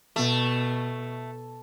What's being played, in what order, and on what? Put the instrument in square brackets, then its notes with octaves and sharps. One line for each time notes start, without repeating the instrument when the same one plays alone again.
[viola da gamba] B2 [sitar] A3